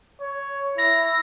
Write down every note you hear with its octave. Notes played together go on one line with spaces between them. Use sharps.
C#5
E4 A#6